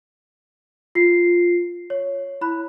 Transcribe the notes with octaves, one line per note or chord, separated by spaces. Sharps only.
F4 C7
C#5
E4 B5 F#6